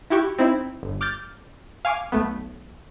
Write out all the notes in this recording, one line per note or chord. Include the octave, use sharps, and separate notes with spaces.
E4 F#4 G4 C#6
C4 D#4 E4
G1
D6 F6 G6 A6
F5 G#5 C#6 D6
B1 A3 B3